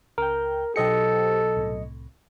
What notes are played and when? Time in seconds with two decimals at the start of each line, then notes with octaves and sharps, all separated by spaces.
0.18 C#2 A#4 G5
0.76 B1 G4 A4 C5 D#5 G5 C#7
1.56 C2 A2